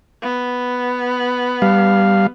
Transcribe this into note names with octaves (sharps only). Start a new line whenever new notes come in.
B3
G3 F5